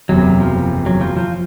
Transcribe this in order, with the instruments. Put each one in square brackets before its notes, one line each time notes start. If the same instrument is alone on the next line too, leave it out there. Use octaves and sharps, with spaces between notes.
[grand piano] F#1 E2 C3 [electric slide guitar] F#3
[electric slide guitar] F3
F#3
F3
F3